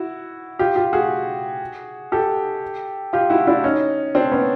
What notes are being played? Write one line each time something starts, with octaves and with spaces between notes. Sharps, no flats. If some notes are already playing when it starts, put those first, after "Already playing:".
Already playing: E4 F#4
F4 G4
F4 G4
F#4 G#4
G4 A4
F4 G4
E4 F#4
D4 E4
C#4 D#4
C4 D4
B3 C#4